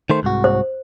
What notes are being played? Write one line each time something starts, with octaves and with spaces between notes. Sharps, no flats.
D#3 A3 C5
C2 G#2 F#4
C5